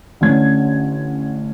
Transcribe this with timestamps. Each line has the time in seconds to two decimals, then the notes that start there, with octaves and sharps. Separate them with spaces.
0.21 A1 D3 C#4 G#6